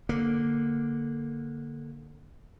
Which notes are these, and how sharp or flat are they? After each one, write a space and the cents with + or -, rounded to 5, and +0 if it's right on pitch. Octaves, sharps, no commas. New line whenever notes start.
D3 +0 A#3 +0